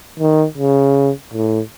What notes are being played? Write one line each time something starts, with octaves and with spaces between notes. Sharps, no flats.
D#3
C#3
A2